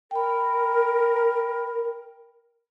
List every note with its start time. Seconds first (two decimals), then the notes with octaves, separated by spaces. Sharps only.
0.11 A#4 G5 B5